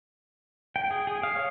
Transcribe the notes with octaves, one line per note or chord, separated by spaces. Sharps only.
G5
G#4
G#4
F5
C#5